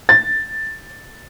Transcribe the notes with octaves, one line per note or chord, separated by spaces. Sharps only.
A6